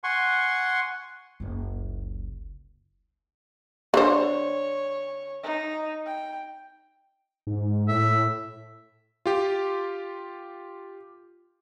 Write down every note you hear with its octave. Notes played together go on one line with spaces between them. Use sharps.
F#5 G#5 C6 C#6
F#1 C#2
D3 C5 C#5
D#4
G5
G#2
A2 E5
F4 G4